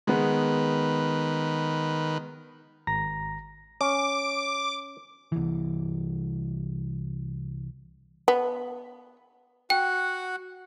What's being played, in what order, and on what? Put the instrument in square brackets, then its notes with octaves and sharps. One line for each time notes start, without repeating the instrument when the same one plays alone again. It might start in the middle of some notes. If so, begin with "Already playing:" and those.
[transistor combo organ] D#3 B4 [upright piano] G#3 B3
[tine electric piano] G#1 A#5 A#6
[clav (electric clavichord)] C#4 [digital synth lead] D6
[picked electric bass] C2 E3
[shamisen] B3
[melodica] F#4 F#5 [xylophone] G5